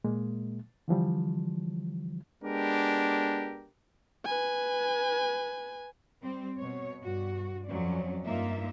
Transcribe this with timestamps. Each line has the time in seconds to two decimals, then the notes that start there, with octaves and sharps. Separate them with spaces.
0.04 A#2 G#3 A#3
0.88 D3 E3 F3 G3
2.43 G#3 B3 D4 G4 A#4
4.25 B4 G#5
6.22 G3 C4
6.57 B2 C#5
7.02 G2 F#4
7.66 F2 F#3 C#4 D5
8.23 G2 A#3 D#4 F4 E5